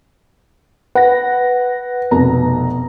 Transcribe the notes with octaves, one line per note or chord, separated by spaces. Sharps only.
B4 F#5 A#6
F1 B2 A#5